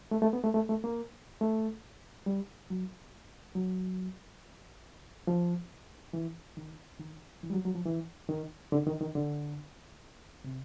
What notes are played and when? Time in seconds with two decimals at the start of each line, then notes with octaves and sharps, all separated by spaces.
0.11 A3
0.22 A3
0.33 B3
0.44 A3
0.54 A3
0.69 A3
0.84 A#3
1.41 A3
2.26 G3
2.70 F#3
3.55 F#3
5.27 F3
6.13 E3
6.57 D#3
6.99 D#3
7.43 E3
7.50 G3
7.53 F#3
7.65 F#3
7.75 F3
7.86 E3
8.29 D#3
8.72 D3
8.87 D#3
9.01 D#3
9.15 D3
10.44 C3